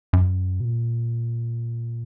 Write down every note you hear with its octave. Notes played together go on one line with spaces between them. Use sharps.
F#2
B2
A#2